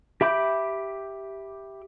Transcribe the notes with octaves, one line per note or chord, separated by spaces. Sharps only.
G4 E5 B5 D6 G6